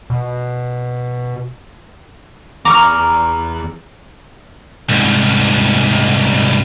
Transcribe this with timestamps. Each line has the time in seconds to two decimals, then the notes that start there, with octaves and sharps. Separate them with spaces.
0.10 B2
2.65 E2 A#5 C#6 D6 F6
4.89 C2 G#2